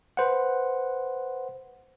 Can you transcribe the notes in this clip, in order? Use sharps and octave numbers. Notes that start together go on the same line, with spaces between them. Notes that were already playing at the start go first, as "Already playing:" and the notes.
B4 C5 F#5